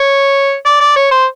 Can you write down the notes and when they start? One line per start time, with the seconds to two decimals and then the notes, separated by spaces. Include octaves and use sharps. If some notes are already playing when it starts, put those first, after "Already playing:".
Already playing: C#5
0.66 D5
0.81 D5
0.96 C#5
1.11 C5